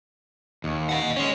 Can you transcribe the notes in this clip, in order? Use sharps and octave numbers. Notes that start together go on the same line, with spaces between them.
D#2
D#5 F#5
G#3 C#4 C#5